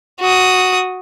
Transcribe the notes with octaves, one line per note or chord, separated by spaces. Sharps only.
F#4 D#6